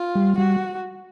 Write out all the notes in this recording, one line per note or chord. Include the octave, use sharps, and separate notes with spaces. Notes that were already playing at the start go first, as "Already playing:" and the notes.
Already playing: F4
G3
G3 F#4